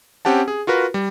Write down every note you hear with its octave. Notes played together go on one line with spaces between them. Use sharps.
C4 C#4 G4 F#5 A5
G#4
F4 F#4 A#4 B4
G3